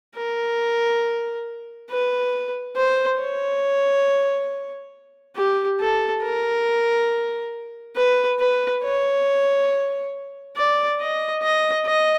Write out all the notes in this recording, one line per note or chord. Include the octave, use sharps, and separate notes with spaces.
A#4
B4
C5
C#5
G4
A4
A#4
B4
B4
C#5
D5
D#5
D#5
D#5